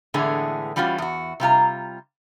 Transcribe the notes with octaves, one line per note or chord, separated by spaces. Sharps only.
A2 D3 E3 G#3 B3 G#4
E3 G3 C#4 F4 F#4
E2 F#4
C3 G3 F4 A#5